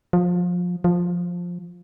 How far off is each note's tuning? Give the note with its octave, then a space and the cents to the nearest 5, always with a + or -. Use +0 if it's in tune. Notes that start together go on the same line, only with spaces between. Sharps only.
F3 +25
F3 +10